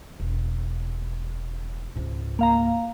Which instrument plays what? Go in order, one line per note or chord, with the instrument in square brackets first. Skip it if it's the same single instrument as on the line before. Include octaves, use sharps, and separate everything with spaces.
[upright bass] E1
C#2 G#2
[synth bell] A#3 F5 A#5